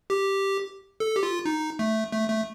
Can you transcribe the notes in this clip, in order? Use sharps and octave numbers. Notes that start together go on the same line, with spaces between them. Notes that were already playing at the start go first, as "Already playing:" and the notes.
G4
A4
G4
F4
D#4
A3
A3
A3